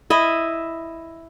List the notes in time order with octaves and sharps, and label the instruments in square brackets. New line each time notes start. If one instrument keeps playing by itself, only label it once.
[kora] E4 D#5 E5